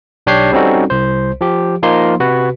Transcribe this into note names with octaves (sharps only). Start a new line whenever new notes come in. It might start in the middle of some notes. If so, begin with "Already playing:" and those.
B1 D4 G4 C#5 G6 C7
G3 C4 C#4 D#4 F#4 A4
C2 C5
F3 G4
F3 A#3 D#4 C6
C3 F#4 B4